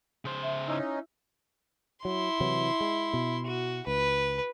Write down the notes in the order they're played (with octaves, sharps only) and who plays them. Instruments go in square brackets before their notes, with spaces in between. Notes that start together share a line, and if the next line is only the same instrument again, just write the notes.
[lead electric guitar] C#3 C5
[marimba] E5
[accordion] C#4 D#4 [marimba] E4 E6
[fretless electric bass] F#3 [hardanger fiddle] E4 C6
[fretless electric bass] C3 E3 F#3
G#3
B2
[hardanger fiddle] F#4
[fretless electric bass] C#2 [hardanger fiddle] B4